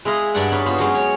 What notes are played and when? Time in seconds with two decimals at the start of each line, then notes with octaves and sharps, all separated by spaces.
0.05 G#3 E4 D#5 F5
0.34 G2 D4 D5 F#5 G#5
0.52 C#4 D#4 B4
0.66 B3 F4 C5
0.79 F#3 G#3 C#4
0.94 C#5